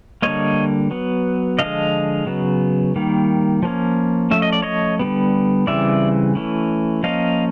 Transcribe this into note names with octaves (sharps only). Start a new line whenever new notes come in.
D3 G3 A#3 C#5 D#5
F#3 B3
D3 F3 G#3 D#5 F5
C#3 F#3 B3
D#3 G3 A#3
F3 A#3 C#4
F3 A3 C#4 E5
D#5
D5
C#5 D#5
D3 G3 B3
C#3 E3 G3 C4 D5 E5
E3 A3 C#4
F3 A#3 C#4 D#5 F5